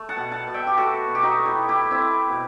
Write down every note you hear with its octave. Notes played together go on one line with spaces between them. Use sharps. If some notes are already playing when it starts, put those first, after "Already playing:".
Already playing: A3
F#5 A5
B2
F#5 A5
B2
E5 G5
G4
A3 F#4 A4
B2
G4
D#4 F#4
A3
E4 G4
A3 E4 G4
C4 E4
A3
B2